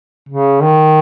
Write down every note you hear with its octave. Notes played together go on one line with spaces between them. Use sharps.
C#3
D#3